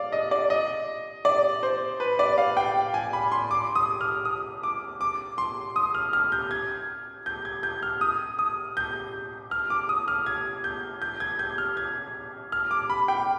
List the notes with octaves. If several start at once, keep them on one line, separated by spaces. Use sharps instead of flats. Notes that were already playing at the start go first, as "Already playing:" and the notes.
Already playing: D5 F5
D#5
D5
D#5
D5
C5
B4
D5
F5
G5
G#5
B5
C6
D6
D#6
F6
D#6
D6
D6
C6
D#6
F6
F6
G6
G#6
G6
G#6
G6
F6
D#6
D#6
G6
F6
D6
D#6
F6
G#6
G6
G6
G#6
G6
F6
G#6
F6
D6
B5
G5